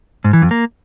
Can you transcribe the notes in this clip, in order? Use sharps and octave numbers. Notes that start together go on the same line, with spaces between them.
G#2
E3
F2
A#3